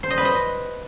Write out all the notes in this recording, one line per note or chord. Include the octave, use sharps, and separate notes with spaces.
C5
D#5
B4
D#5